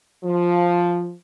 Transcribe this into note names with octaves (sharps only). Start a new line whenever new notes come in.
F3